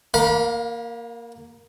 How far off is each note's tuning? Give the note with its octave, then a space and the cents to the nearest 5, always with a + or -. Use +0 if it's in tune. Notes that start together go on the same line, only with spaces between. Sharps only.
A#3 +0 F5 +40 B5 -35